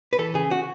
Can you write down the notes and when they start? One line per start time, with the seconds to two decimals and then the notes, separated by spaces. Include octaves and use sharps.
0.13 B4
0.19 E3 A4
0.34 C#3 G#4
0.51 F#4